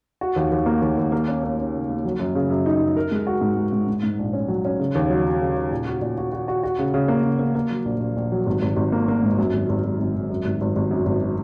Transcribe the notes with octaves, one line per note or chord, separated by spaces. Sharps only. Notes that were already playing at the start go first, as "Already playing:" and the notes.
F#4
D#2
D#2
A#3
D#2
D#2
A#3
C#4
A#3
C#4
C#3
A#3
F#3
F#2
C#3
F#2
D#4
F#2
A#4
G#3
F#4
G#2
G#3
G#2
G#2
G#2
A#1
C#4
F#3
C#4
C#3
D#2
F#3
F#3
C#3
C#3
A#2
F#4
A#2
F#4
F#4
F#4
F#4
C#3
C#3
A#3
C#3
A#3
A#3
F#3
A#1
A#1
A#1
F#3
G#1
G#1
G#1
A#3
A#3
G#2
F#2
G#1
G#1
G#1
G#1
G#1
F#2
G#1
G#1
G#1
F#2
G#1